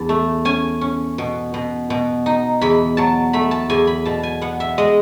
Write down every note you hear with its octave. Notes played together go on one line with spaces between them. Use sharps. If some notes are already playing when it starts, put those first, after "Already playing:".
Already playing: E2 A5
A3
C#4 G#5
C#4
B2
B2
B2
D#4
E2 B5
F#3 A5
A3 B5
A5
E2 G#5
B5
B2 A5
G#5
B3 F#5
E5
G#3 D#5